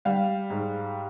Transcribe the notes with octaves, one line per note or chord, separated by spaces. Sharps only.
G3 F5
G#2